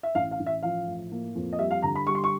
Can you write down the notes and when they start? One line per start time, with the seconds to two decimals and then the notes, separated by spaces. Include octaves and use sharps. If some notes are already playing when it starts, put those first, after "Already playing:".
0.03 E5
0.15 A1 F5
0.31 F5
0.40 A1
0.46 E5
0.63 F3 F5
0.87 A2
1.12 A#3
1.35 F2
1.53 D#5
1.59 G3 E5
1.71 F5
1.82 D3 A#5
1.95 B5
2.07 G3 C#6
2.15 C6
2.24 C#6